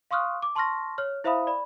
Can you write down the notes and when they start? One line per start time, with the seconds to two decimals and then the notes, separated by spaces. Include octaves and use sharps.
0.11 F5 C6 C#6 D#6 F6 F#6
0.42 D6
0.55 A5 C6 C#6 F6 A#6
0.98 C#5 F6
1.24 E4 C5 E5 F5 B5 D#6
1.47 D5 B5